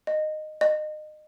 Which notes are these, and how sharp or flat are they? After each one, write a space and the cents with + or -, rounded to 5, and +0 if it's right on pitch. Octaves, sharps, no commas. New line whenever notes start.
D#5 -15
D#5 -30